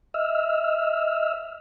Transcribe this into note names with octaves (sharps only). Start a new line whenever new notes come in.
D#5 E5 E6 F6